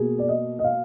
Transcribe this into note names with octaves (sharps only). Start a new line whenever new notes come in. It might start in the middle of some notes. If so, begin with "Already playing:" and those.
Already playing: B2 A#3 G#4
D5
D#5
D#5
F5